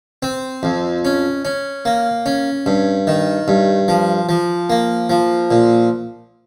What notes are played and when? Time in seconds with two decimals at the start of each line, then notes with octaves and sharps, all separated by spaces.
0.23 C4
0.63 F2
1.05 C#4
1.45 C#4
1.85 A#3
2.26 C#4
2.66 G2
3.07 D#3
3.48 G2
3.88 F3
4.29 F3
4.70 A#3
5.10 F3
5.51 A#2